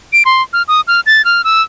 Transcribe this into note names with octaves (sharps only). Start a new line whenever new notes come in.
D7
C6
F6
D#6
F6
A6
F6
E6